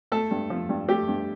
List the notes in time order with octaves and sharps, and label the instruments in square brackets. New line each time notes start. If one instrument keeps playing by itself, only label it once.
[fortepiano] A3 A4
G2
F3
G2
A3 G4
G2